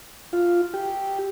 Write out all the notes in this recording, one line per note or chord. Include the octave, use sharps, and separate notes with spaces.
F4
G4